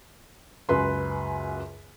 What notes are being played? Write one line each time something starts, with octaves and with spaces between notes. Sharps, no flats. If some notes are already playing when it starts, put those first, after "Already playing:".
C#2 F#2 B4 C6